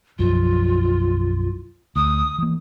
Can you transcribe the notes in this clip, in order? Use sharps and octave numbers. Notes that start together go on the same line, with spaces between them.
B1 F#2 F3 F4
D2 D#6
E3 A#3